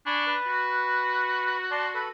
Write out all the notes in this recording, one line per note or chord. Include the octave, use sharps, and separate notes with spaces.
D4 G#5 B5 C#6
B4
F#4
D5 A5 C6
A4 B4 B5